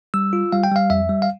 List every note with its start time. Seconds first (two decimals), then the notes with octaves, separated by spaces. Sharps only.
0.14 G3 E6
0.33 F4
0.52 G3 F5
0.64 G5
0.72 G3 F5
0.90 F2 E5
1.09 G3
1.22 F5